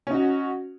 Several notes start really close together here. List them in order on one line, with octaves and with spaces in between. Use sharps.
C#4 D#4 F#4